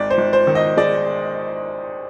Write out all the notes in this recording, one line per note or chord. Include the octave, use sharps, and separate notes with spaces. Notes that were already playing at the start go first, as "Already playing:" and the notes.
Already playing: G#1 D5
C5
G#1
C5
D#3
D#5
G#3 D5